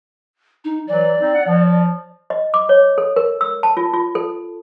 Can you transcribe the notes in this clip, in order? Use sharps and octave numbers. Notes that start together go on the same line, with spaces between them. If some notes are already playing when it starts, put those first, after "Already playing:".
D#4
E3 F#3 D5
C4 D#4
F#5
F3
D#5
D6
C#5
A4
A#4
E6
A5
F4
F4
A4